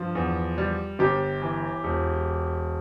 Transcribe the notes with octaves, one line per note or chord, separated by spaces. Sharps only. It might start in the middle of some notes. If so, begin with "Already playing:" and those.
Already playing: G2 F3
E2
G3
G1 G4
E3
E1